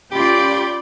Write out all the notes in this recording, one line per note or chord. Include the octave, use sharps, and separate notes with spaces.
C#4 F4 G4 D5 B5 G6